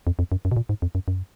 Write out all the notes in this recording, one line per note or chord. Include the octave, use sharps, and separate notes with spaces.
F2
F2
F#2
F#2
B2
A#2
G#2
F2
F#2
F#2